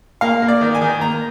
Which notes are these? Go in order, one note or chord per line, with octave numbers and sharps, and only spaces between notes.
A#3 F5
A#3
D5
D#3
G#5
D#3
A#3 A#5